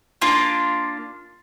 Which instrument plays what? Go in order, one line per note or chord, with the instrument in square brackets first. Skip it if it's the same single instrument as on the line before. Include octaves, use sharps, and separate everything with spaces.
[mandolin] A#3 D4 F4